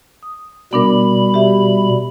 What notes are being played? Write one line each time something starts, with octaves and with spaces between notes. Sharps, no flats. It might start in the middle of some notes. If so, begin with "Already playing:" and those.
D#6
B2 G3 B3 D4 A#4 B5
G4 E5